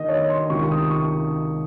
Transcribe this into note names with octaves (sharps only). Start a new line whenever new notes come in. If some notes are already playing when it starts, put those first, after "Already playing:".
Already playing: D#3 D#5
C#5
C6
C#2 C3 D#3 C#6
D#6
C#6